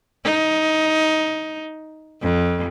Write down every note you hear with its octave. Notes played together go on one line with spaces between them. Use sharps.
D#4
F2